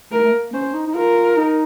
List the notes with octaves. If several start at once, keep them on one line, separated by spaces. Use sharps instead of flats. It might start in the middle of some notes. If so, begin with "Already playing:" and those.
A3 A#4
A3
A#3
C#4 C5
D#4
D#4
F4 A#4
D#4